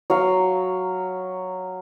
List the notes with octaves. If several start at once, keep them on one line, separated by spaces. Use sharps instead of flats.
F#3 F5